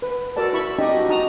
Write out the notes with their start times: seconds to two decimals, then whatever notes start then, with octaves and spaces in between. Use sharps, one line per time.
0.02 B4
0.36 F#4 A4 A#4 D5 A5
0.53 E4 B5 C#6
0.79 D4 D#4 G4 D#5
0.94 F#4
1.09 D#4 F#4 A5 A#5 D#6